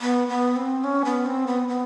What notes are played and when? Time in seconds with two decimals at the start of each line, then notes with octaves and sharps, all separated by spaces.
0.01 B3
0.28 B3
0.56 C4
0.84 C#4
1.05 B3
1.26 C4
1.47 B3
1.68 B3